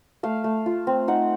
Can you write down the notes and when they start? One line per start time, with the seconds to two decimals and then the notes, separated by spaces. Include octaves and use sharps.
0.23 A3 F5
0.44 A3
0.66 F4
0.87 C4
1.08 D#4 F#5